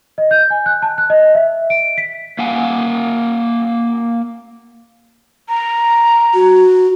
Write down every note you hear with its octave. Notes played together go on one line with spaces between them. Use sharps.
D#5
G6
G#5
F#6
A5
F#6
D#5
E5
D7
B6
A#3 F5 F#5 G#5
A#5
F#4